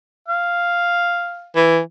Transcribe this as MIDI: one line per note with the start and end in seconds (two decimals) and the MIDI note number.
0.28 1.50 77
1.56 1.79 52